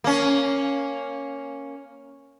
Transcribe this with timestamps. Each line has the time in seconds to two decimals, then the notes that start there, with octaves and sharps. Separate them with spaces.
0.04 A#3 C#4